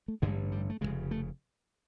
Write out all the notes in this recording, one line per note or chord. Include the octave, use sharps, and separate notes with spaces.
A3
A1 G2 D3 G#3
G3
A3
F1 D#2 C#3 G#3
A3